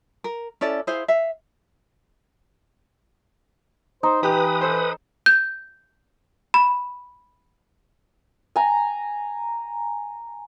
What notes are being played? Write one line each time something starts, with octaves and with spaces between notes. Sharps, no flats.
A#4
C#4 E4 A4 D5
E4 G#4 C5 F5
E5 F5
D#4 C5
E3 G4 B4 D#6
A4 C5
G6
B5
G#5 A#5